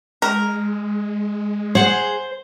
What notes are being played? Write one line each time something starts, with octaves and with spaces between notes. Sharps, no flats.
G#3 A#4
G#4 C5 F#5